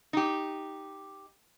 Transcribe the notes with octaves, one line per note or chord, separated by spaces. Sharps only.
D#4 G4